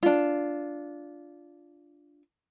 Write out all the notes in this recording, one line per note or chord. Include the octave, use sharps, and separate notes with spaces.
D4 F4